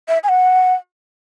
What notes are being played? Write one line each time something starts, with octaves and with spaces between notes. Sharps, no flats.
E5
G#5
F#5